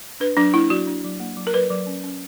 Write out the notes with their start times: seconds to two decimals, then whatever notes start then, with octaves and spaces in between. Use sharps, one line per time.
0.20 D4 B4
0.37 F#3 D4
0.54 A#3 E4
0.70 F#3 F#4
0.87 D4
1.04 F#3
1.20 A#3
1.37 F#3
1.47 A#4
1.54 F#3 B4
1.70 F#3
1.87 C#4
2.04 C#4